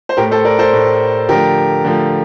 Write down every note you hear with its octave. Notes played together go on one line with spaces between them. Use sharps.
C5
A2 A3 G4 A#4
A4 C5
A#4 D5
A4 C5
A2 A3
D3 F3 A3 G4 A#4
D3 F3 A3